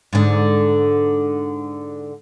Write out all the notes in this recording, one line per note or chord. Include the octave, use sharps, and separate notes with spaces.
G#2 D3